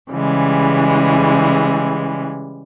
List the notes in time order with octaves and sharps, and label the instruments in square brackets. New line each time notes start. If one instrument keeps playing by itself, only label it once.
[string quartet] C#3 E3 G3 G#3